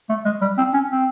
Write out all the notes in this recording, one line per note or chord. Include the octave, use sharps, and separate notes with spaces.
A3
G#3
G3
C4
C#4
C4